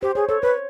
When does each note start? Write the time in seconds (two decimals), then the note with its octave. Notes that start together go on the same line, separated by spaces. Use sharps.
0.02 G4 C5
0.15 G#4 C#5
0.29 A4 C#5
0.42 B4 C#5